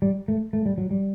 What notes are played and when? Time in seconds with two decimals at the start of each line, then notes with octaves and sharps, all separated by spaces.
0.02 G3
0.28 A3
0.53 A3
0.66 G3
0.78 F#3
0.91 G3